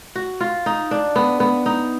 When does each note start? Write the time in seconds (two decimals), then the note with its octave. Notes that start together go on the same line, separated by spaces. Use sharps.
0.15 F#4
0.40 F4
0.66 D#4
0.91 D4
1.16 B3
1.40 B3
1.66 D#4